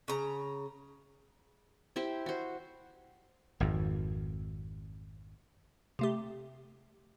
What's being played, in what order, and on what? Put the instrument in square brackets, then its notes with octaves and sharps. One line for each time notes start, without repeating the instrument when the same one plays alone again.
[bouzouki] C#3 A#5
[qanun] E4 G4 C5
F#4 C5
[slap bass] G#1 F2
[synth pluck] C3 A3 G4